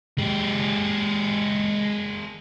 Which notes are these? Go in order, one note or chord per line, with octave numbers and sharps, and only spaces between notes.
G#3 G4